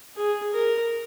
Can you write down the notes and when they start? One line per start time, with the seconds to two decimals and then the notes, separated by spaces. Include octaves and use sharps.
0.15 G#4
0.53 A#4